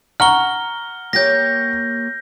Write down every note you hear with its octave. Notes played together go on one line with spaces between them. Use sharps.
F#5 A#5 C#6 F6 G7
A#3 G4 C#5 G6 A#6